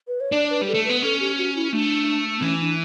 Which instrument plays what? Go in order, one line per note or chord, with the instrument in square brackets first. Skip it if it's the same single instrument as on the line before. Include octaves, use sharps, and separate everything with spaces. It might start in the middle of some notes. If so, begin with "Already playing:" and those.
[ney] B4
C#5
[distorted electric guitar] D4 [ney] D5
[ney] B4
[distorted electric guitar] G3
[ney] A4
[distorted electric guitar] A3
[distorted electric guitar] B3 [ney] B4
[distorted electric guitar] C#4 [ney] A4
[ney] G4
F#4
E4
[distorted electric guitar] A3 [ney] D4
[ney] B3
[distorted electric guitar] E3 [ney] C#4
[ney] D4